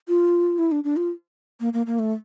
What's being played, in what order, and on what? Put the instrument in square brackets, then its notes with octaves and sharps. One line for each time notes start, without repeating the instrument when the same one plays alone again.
[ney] F4
E4
D4
D4
F4
A#3
A#3
A#3
A3